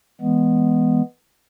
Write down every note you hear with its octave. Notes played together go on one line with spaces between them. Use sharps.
E3 G#3 B3